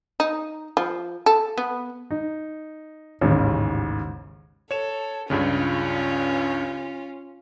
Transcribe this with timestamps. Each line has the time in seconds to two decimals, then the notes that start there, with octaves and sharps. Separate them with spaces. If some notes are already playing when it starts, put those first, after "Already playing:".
0.20 D#4
0.77 F3
1.26 A4
1.58 B3
2.11 D#4
3.21 A1 D#2 G#2 C#3
4.71 A4 C#5 E7
5.30 C#2 G2 C#3 C#4 F4